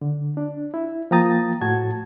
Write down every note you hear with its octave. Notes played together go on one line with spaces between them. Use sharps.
D3
D4
E4
F3 A#3 G5 A#5 D#6 A6
A2 F#4 A5 G#6